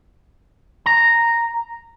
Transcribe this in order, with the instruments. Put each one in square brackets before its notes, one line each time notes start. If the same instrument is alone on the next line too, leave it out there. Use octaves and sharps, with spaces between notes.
[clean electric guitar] A#5